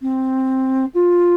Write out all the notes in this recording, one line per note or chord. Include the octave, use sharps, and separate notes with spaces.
C4
F4